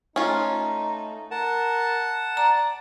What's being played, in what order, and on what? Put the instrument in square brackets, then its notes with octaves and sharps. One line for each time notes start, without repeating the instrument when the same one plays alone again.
[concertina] A3 [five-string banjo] C#4 F4 [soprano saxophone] D#4
[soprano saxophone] A#4 [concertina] F#5 A5
[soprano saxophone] D5 [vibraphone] A#5